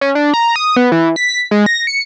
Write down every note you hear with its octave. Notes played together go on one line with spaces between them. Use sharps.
C#4
D4
A#5
D#6
B3
E3
B6
G#3
A#6
C#7